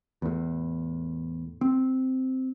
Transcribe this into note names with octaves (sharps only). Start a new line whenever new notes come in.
E2 A2
C4